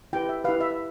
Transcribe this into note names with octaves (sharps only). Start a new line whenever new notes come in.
E4 G4 B4 G5
E5
E4 G4 B4 F5
E5